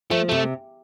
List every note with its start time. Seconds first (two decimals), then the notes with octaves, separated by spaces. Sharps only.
0.11 F3 A3
0.29 C3 A3